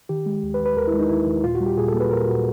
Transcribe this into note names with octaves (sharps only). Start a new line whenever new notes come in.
D#3 G4
G#3
D#2
B4
D#2
B4
D#2 A#4
E4
G#3
D#4
D#2 E4
D#2
A#2 F4
F#4
G3
G4
A#2 G#4
A4
A#3
B4
A#2 A#4
A#2 F#4